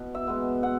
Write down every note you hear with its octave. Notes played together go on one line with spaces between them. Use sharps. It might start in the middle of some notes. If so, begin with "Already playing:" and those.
Already playing: B2
E5
G#3 B3
B2 F#5